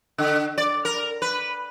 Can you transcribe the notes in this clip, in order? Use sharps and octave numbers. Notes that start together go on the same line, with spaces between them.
D3
D5
A#4
B4